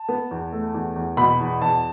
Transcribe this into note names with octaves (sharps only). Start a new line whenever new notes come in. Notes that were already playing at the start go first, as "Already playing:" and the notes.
Already playing: A5
B3
E2
A3
E2
E2
B2 B5
E2
E2 A5